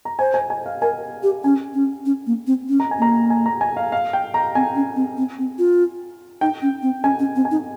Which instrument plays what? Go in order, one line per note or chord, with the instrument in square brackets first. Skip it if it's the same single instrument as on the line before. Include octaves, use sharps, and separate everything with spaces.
[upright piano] A#5
[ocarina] C5 [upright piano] G#5
[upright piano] G#5
G#5
F5
[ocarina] A#4 [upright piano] G#5
[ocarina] G4
[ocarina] C#4 [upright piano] G#5
[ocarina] C#4
C#4
A#3
C4
C#4
[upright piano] A#5
G#5
[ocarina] A#3 [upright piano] A#5
[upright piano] G#5
A#5
G#5
F5
F5
G5
A#5
[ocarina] C4 [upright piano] G#5
[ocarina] C#4
C4
C4
C4
F4
[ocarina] D#4 [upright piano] G5
[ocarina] C#4
C4
[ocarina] C#4 [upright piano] G#5
[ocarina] C#4
C4
[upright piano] G#5
[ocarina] D#4